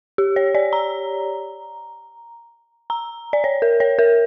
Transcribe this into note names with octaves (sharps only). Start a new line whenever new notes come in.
G4
C#5
D5
A#5
A#5
D5
C#5
A#4
C#5
A#4